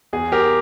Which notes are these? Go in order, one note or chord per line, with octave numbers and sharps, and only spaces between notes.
E2 G#4
G4 A#4